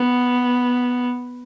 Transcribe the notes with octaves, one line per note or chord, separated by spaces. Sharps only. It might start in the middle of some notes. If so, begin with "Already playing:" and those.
Already playing: B3